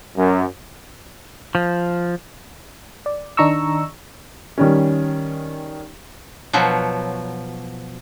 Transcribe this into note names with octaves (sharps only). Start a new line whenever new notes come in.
F#2
F3
D5
D#3 D4 D#4 A#5 C#6 E6
D#3 G3 C#4
B2 F3 F#3